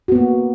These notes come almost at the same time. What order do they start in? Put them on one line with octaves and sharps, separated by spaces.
F#4 B3 A#3